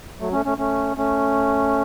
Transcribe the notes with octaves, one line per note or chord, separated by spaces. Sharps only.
F#3 A3
A3 C#4
A3 C#4
A3 C#4
A3 C#4